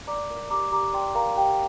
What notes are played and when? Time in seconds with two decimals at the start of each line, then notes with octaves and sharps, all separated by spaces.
0.07 D5 A#5 D6
0.30 A#4
0.50 G4 A#5 D6
0.72 G4 A#5 D6
0.93 D5 G5 C6
1.15 A#4 F5 A#5
1.38 G4 G5